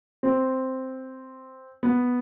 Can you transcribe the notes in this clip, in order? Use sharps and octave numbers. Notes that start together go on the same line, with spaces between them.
C4
B3